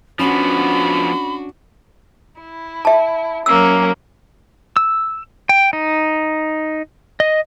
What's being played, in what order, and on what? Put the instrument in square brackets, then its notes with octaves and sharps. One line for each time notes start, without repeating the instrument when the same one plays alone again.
[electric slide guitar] F3 B3 [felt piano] C#4 [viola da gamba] D4 F#4 [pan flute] B5
[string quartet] E4
[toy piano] E5 A5
[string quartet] F#3 A#3 C#4 [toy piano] E6
[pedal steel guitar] E6
G5
D#4
D#5